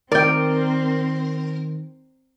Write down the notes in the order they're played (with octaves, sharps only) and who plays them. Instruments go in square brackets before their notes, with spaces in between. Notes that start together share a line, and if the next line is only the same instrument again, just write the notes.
[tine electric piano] D#3 [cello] C4 [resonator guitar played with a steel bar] A#4 [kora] D5 G5